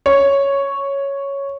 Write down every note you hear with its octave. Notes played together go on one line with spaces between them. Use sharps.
C#5